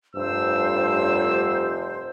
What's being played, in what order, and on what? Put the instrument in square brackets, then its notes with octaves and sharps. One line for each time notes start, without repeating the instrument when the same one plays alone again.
[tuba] F1 [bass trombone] G2 [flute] C5 [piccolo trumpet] E6